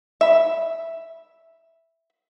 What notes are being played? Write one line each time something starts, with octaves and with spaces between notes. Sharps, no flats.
E5 B5